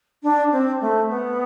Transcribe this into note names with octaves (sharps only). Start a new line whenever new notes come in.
D4
C4
A3
B3